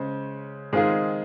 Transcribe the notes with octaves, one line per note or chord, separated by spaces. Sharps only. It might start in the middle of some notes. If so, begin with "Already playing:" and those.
Already playing: C#3 G#3 C#4 C5
D#3 G#3 C4 F4 G#4